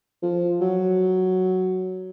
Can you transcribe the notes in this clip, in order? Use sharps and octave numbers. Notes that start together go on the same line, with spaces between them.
F3
F#3